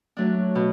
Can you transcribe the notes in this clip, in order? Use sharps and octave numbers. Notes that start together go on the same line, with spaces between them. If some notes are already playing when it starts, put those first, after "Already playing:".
F#3 A3 D4
B2